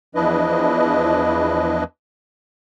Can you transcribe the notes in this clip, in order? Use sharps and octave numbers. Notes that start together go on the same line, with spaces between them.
E2 F3 D4 E4 B4 D#5